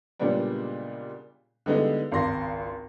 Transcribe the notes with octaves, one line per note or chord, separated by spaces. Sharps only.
A#2 C#3 G3 G#3 B3 D4
D3 G3 G#3 B3 D#4 E4
G#1 C#2 C6 A#6